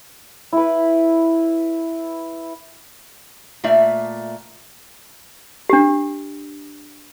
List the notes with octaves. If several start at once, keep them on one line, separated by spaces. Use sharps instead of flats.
E4 B4
A#2 A3 D5 E5
D4 G4